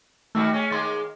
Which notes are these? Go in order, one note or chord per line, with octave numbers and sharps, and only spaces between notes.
D#3 G3 A3 F#4
G#3 C#4
D#3 G#3 A#3 C6 A6